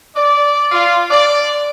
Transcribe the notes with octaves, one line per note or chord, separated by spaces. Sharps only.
D5
F4
D5